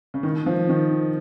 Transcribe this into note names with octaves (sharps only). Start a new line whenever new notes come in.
C#3
D#3
F3
D#3